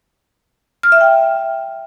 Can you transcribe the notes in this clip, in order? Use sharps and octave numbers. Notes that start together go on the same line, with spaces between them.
F6
E5
G5